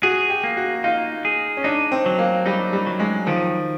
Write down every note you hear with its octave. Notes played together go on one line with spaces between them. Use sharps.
F#4 G#4
G4
A#3
F#4
D#4 F4
G#4
C#4
D4 D#4
C4
F#3
A#3
G3 D#4
G3
F#3
G#3
D#3 F3